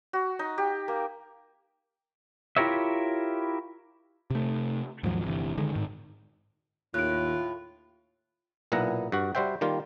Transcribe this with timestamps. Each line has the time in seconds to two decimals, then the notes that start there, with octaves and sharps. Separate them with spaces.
0.13 F#4
0.39 D#4
0.58 G4
0.88 A#3
2.57 E4 F4 G4 A#4 C#5 E5
4.30 C3 A3
5.03 D#2 G#2 F3 F#3
5.24 G1 C3 E3
5.58 D3 D#3 G#3
5.72 G#2 D#3
6.94 D#2 A2 F4 F#6 D7
8.72 B1 A#2 B3 E4 F#5 A#5
9.12 G2 F#4
9.35 G3 F#4 C5 E5 G5
9.61 D#3 G3 A#3 F4